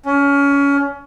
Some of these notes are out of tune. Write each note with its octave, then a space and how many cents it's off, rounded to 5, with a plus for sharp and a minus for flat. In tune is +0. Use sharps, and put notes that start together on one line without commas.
C#4 +25